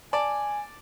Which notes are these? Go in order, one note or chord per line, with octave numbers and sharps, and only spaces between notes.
D5 G#5 A5